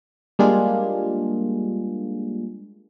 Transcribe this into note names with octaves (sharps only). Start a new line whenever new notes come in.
G3 G#3 A#3 D4 F4 G#4